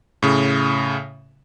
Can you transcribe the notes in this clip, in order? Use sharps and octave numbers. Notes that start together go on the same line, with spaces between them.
A2 C#3